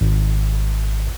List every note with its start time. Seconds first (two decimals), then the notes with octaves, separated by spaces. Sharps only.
0.01 G#1